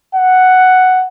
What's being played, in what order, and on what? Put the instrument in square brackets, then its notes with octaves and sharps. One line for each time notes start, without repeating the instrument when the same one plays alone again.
[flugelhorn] F#5